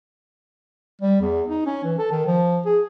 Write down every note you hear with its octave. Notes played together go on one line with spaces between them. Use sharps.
G3
E2
D#4
C#4
E3
A4
D#3
F3
G#4